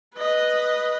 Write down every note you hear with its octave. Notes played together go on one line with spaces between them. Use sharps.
B4 D#5